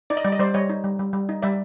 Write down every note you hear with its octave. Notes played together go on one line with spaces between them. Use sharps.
D#4 D5
D#5
G3 D5
D#5
G3 C5 D5
G3 C#5 D#5
D#4
G3
G3
G3
D#4
G3 D5 E5